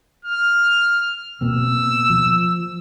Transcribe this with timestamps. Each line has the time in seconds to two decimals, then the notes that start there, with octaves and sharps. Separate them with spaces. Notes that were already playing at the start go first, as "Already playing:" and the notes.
0.25 F6
1.41 B2 A#3 C4 E6
2.10 F3